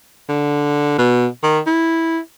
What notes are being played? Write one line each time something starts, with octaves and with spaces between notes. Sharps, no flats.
D3
B2
D#3
E4